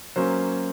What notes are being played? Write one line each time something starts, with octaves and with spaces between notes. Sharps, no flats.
F#3 A#3 C#4 C5